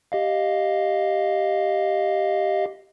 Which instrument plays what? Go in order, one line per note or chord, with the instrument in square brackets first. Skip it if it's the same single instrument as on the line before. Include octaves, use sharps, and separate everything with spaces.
[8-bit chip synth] G4 D#5 F5